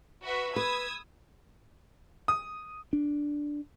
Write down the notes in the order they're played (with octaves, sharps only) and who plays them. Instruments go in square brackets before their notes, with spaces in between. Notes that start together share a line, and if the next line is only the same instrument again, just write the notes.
[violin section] F#4 B4 E5
[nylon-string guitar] B4 [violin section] D#6 E6 G#6
[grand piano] D#6
[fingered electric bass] D4